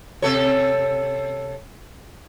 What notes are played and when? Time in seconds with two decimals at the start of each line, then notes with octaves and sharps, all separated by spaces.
0.22 C3 A4 C#5